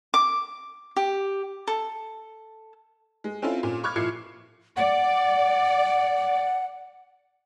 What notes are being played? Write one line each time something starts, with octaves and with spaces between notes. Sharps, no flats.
D6
G4
A4
G#3
C4 C#4 E4 F4 A4
A#2 C#4
B5 C#6 D6 F6 G#6
A#2 F3 E4 G#6 C7 C#7
D5 F#5